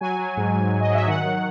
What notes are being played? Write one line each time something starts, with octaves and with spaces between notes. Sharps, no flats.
F#3 G#5
F#3
G#2
G#2
F#3
D#5
F#3 E5
D#3 F#5
F#3